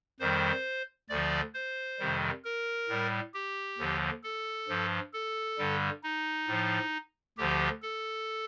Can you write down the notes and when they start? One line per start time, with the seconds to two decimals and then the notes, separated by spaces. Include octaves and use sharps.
0.20 F2 D#3 G3 C5
1.09 D2 D3 F3 D5
1.54 C5
1.99 F2 C3 D#3 G3
2.44 A#4
2.89 A2 G3
3.34 G4
3.78 D#2 D3 F3
4.23 A4
4.68 G2 F3
5.13 A4
5.58 G2 D3 G3
6.03 D#4
6.48 A2 F3
7.38 D2 D3 F3 G4
7.82 A4